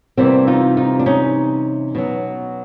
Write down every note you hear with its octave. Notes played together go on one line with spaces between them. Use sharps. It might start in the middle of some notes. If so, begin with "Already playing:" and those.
C3 E3 G3 A#3 C4
D#4 F4
D#4 F4
D4
C#4 D#4
B2 F#3